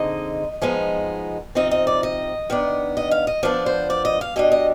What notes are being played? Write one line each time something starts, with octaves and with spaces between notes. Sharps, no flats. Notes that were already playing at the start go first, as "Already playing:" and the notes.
Already playing: D3 G#3 C4 D#4 D#5
F3 G#3 B3 D#4
C3 F3 C4 D#4 D#5
D#5
D5
D#5
D#3 B3 D4
D#5
F5
D#5
F3 B3 D4 D5
C5
D5
D#5
F5
B2 G3 D4 D#5
D#5